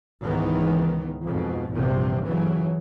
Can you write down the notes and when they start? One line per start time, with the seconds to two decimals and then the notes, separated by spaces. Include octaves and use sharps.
0.24 C#2 G#2 D#3 E3 B3
1.25 F2 G#2 B2
1.72 A#1 E2 G2 C3 F3
2.24 G1 C#3 E3 F#3